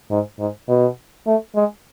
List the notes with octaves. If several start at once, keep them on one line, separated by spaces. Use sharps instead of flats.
G#2
G#2
B2
A3
G#3